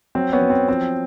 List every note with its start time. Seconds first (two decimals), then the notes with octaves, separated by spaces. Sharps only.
0.15 F#3 C4
0.32 B3 C#4
0.41 F#3
0.50 C4
0.68 F3 C4